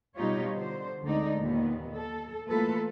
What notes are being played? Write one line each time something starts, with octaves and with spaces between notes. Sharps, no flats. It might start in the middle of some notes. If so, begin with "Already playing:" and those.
B2 G3 D#4 F4 G4 C#5
D3 C5
D2 D3 G#3 C4 D#4 D5
D#2 A#2 D#3 B3
A4
E3 A3 A#3 F4 A4 B4